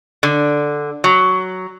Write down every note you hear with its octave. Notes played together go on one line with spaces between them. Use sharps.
D3
F#3